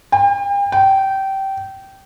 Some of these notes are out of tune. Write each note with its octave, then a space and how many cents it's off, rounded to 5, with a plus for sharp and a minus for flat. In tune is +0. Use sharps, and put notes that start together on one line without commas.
G5 +40
G5 -20